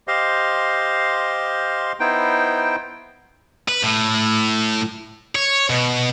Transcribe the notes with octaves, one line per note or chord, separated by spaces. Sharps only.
G4 C5 D#5 F5 C6
B3 D#4 E4 C5 G5
B4
A2
C#5
B2